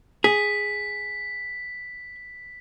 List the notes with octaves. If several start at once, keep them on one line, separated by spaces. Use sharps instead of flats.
G#4 B6